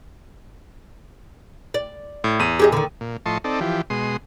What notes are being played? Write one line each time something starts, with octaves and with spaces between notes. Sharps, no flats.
D5
A2
E2 D#7
G4 G#4 D#5
D3 D#3
A#2
A2 F3 D#5 A5 C6 C#6
C4 D#4 A4 D5
E3 F3 G4
B2 G#3 C6 D#6